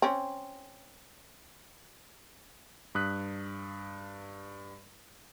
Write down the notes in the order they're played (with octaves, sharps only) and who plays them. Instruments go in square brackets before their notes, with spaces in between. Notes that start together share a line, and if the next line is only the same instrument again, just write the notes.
[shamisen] C4 C#4
[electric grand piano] G2 D#6 F#6 B6